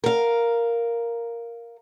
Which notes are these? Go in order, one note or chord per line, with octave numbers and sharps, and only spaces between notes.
A#4 F5